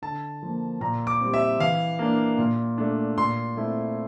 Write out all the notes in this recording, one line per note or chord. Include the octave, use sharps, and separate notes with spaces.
D3 A5
F3 A#3
A#2 A#5
D6
G3 C4
E5
E3 F5
A#3 D4
A#2
A3 D4
A#2 C6
A3 C4 E4